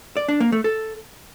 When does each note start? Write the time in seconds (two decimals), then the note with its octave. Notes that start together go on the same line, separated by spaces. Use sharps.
0.17 D5
0.29 D4
0.40 A#3
0.52 A3
0.64 A4